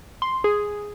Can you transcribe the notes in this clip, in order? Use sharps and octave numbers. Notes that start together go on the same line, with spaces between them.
C6
G#4